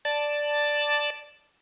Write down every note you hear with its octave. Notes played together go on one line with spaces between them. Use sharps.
D5 A5